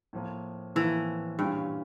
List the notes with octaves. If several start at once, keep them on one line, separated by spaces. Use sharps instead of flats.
A2 F3 A#3
A2 E3 F3 A#3
G2 A#2 G3 C#4 F4